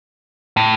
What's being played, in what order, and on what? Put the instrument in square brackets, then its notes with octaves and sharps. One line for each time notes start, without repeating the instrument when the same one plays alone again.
[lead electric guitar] A2